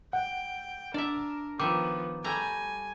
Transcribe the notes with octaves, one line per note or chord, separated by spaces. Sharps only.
F#5 G5
D4 A#4 D5 E5
D#3 F3 B3 E5 D6
G3 A3 G#5 A#5